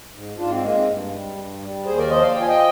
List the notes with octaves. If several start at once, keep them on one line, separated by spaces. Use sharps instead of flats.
G#2
G#2 D4 F4
C4
G#3 A#3
C4
G2
G3
G2
G3
D#2 G#4 C5
A#4 D5
F3 C5 D#5
D5 F5
F3 G5
G#5
D#5 G5